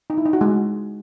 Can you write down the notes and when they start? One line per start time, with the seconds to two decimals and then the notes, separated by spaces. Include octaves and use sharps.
0.10 D#4
0.18 E4
0.25 D#4
0.33 F#4
0.41 G#3